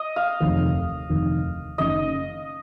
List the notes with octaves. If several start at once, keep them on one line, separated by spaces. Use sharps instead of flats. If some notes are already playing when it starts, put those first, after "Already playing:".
Already playing: D#5
F5
F1 D#2 D#3
F1 D#2 D#3
F#1 F#2 D#3 D#5